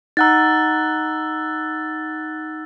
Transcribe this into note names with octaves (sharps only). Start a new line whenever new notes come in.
D#4 F#5 A#5 E6 F#6 A6